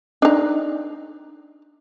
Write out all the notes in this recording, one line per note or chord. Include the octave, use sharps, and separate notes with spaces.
D4 D#4